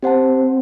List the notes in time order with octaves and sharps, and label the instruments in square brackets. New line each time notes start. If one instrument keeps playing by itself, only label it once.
[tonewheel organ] C4 [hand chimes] G4 C5 F#5 A5